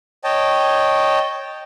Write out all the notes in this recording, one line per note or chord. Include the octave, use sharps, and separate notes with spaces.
C#5 D#5 G5 A5